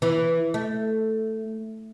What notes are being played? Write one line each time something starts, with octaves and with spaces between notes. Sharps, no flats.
E3
A3